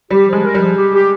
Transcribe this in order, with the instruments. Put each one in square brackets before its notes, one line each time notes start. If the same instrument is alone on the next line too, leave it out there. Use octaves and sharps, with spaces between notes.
[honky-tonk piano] G3 [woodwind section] G4
[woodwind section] F3
[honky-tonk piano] G#3
[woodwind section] A#4
[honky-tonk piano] G3
[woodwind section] F3
G4
G4